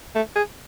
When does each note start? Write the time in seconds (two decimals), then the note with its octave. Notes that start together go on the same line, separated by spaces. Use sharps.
0.15 A3
0.36 G#4